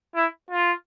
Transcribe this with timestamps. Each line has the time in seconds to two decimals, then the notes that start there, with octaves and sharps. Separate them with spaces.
0.15 E4
0.51 F4